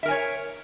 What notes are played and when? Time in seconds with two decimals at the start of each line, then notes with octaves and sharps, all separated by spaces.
0.03 E5
0.06 A#4
0.08 G#5
0.11 C#5